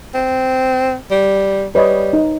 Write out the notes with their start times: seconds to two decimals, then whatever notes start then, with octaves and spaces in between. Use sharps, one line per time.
0.15 C4
1.11 G3
1.75 G3 B4 C#5 D#5
2.13 D#4